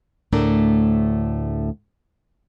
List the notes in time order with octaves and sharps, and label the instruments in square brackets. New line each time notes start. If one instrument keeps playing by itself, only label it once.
[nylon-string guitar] D2 A2 A3 D4 A#4